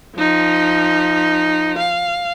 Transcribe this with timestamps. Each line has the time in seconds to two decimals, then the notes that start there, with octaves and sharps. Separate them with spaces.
0.17 F3 D#4
1.78 F5